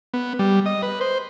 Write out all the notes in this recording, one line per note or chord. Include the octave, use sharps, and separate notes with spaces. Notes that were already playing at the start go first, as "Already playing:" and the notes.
B3
G3
D#5
B4
C5